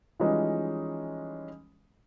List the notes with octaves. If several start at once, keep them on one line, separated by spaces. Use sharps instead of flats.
E3 F3 G3 G#3 C#4 D#4